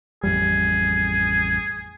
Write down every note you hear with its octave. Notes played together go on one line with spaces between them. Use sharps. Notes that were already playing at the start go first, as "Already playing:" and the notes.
A1 F2 G3 G#4